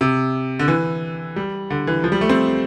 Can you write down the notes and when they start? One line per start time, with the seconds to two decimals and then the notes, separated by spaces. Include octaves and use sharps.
0.01 C3
0.59 D3
0.68 E3
1.36 G3
1.70 D3
1.87 E3
2.04 F3
2.12 G3
2.21 A3
2.29 C4